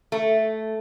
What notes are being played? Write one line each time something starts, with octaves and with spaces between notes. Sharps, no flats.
A3